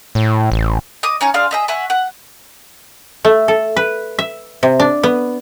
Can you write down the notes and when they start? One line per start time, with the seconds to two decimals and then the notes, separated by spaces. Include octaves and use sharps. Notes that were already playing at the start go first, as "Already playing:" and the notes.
0.15 A2
0.52 A1
1.03 D#5 D6 D#6
1.21 C#4 D#4 G#5 C#6
1.34 D4 G#4 F5 C6
1.51 G#4 D#5 E5
1.68 E5 F#5 G#5 C#6
1.90 F#5
3.25 A3
3.48 A4
3.76 B4
4.19 E5
4.63 C3
4.80 D4
5.03 B3